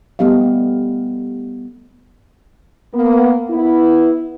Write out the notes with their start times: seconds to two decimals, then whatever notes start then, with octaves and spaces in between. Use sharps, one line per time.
0.19 G3 A3 B3 G4 D#5 F5
2.94 A#3 B3
3.51 B3 E4